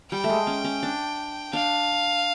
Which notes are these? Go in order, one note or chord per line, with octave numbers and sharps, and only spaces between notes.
G3 G5
A3
G#3
C#4
C#4
D4
D4 F5